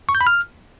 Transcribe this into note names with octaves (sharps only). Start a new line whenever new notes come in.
C#6
G6
B5
F6